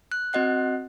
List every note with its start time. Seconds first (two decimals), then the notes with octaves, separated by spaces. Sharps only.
0.12 F#6
0.33 C4 F#4 D#5 F#5 F#6